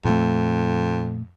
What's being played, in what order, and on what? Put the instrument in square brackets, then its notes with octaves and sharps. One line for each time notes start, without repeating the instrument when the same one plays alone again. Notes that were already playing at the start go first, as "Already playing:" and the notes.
[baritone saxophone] F2 [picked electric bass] A#2 A3